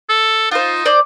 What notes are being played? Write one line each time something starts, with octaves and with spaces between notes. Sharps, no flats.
A4
D#4 F4 C5
C5 D5